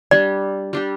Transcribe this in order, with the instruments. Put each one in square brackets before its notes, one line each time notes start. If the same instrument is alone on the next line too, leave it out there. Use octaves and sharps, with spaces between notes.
[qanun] G3 D4 G4 [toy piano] D5
[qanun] G3 D4 G4